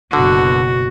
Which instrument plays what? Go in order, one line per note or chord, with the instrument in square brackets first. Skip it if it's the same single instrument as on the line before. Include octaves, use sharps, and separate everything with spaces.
[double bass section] F#1 B2 [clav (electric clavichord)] D3 [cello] F#4